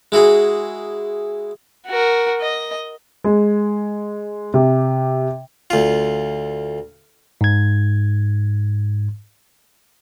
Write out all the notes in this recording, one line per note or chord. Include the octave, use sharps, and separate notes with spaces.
G#3 E4 F#4 G#4
F#4 A#4
D#5
G#3
C3
D2 F4
G#2 G#6